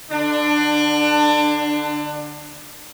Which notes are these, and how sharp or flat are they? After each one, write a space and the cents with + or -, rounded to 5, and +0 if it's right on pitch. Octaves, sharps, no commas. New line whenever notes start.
D3 +0 D4 +25